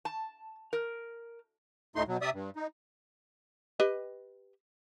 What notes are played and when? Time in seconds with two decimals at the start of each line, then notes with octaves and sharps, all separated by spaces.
0.05 A5
0.73 A#4
1.96 D2 A2 A3 D#4 C6
2.08 B2 F#3
2.22 C3 D5 E5 D#6
2.33 G2
2.56 D#4
3.80 G4 B4 D#5